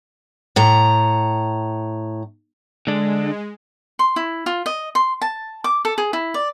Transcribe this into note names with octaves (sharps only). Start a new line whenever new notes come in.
A2 A#5
D3 G#3 D4
C6
E4
F4
D#5
C6
A5
D6
A4
G#4
E4
D5